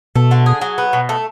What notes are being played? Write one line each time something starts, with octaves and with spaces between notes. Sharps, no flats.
B2 A3
D3
G#4
F#3
B3
B2
A3